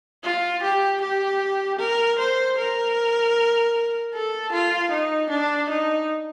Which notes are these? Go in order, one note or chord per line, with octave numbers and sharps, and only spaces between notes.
F4
G4
G4
A#4
C5
A#4
A4
F4
D#4
D4
D#4